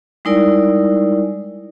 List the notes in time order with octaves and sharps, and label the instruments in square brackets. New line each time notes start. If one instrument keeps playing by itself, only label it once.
[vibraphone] G3 G#3 D#4 E4 A#4 D5